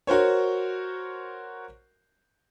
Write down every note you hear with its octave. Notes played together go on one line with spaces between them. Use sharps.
F#4 A#4 C5 C#5